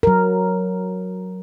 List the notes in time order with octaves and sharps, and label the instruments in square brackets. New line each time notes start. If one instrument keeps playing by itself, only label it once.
[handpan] F#3 A#4